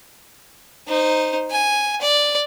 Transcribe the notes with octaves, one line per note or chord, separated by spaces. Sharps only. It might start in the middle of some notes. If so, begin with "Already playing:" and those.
D#4 C5
G#5
D5